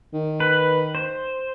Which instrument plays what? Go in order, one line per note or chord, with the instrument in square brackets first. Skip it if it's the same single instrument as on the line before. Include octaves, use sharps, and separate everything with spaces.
[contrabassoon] D#3
[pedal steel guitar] B4
C5